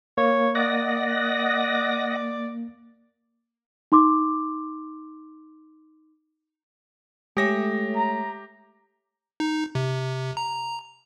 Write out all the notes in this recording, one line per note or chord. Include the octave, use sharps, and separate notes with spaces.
A#3 C#5
D5 D#5 F#5 A#6
D#4 C6 D6
G#3 A3 G4 C#5 E5 A#6
A#5
D#4
C3
A#5